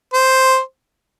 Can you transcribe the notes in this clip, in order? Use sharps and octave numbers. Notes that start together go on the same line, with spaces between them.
C5